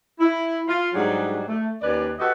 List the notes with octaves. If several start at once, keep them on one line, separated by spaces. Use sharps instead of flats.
E4
F4
G#2 F#3 G3 D4 G#4
A3
D#2 C#4 B4 D5
F#4 G4 A4 B4 D#5 F#5